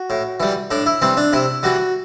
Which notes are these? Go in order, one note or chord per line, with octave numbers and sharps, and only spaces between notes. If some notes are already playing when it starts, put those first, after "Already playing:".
Already playing: F#4
A2
E3 G3
A2 D4
E4
E3 G3 C4
D4
C3 E4
E3 G3 F#4